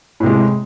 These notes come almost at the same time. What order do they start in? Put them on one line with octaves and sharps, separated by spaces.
A2 C3 G#3